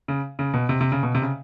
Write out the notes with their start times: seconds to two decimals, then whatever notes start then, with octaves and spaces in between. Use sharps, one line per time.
0.08 C#3
0.39 C#3
0.54 B2
0.69 C3
0.81 C3
0.92 C#3
1.03 B2
1.15 C3
1.22 C#3